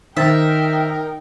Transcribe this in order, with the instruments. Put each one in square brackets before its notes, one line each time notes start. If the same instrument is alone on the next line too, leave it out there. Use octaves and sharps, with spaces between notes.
[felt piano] D#3 C5 A6 [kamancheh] D#4 G5 [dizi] A#4 [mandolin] E5